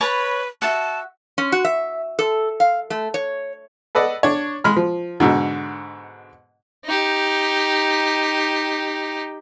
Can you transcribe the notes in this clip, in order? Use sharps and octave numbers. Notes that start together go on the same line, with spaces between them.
B4 C#5 A5 B5
F#4 E5 F#5 A5
C#4
F#4
E5
A4
F5
A3
C#5
A4 B4 D5 D#5 F#5
D4 C#5
G#3 B5 F6
F3
G#2 B2 D3
D#4 G4